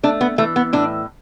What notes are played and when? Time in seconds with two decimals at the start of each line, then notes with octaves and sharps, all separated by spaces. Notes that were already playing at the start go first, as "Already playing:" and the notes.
0.03 A3 D4
0.21 B3
0.38 E3 A3
0.56 B3
0.73 A2 D4